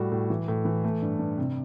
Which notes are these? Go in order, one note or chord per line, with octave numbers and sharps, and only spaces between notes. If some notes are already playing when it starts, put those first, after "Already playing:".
Already playing: A2 G3 F#4
A2
E3
A2
E3
A3
G2
G2
C3